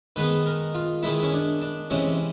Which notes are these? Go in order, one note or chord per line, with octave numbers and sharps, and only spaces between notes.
D#3 G#3 B3 B4
A#4
F4
D#3 G#3 B3 E4
C#4
D4
D4
C3 E3 G#3 C#4